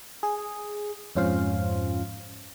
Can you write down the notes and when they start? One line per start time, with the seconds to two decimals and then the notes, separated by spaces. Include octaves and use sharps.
0.23 G#4
1.15 F2 G#2 C#4 F4 C5 F5